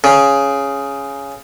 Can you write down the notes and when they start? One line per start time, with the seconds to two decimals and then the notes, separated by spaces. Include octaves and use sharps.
0.04 C#3